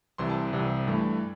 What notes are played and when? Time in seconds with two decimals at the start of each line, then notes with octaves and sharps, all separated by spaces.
0.18 C2 C3 E3 C6
0.30 A5
0.53 C2 C3 E3
0.87 G2 E3 A3